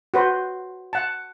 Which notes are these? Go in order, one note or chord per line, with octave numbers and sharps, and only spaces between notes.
F#4 B4 C5
F#5 A5